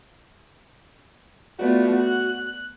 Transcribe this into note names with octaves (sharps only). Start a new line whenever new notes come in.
A3 B3 F4 F#4 C#5 D5
F#6